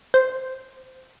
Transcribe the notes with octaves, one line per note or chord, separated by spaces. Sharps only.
C5